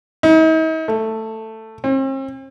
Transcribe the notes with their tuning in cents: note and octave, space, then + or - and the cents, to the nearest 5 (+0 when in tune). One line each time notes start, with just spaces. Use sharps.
D#4 +45
A3 +10
C4 +45